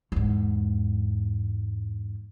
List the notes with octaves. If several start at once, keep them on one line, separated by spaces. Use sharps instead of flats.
E2 G#2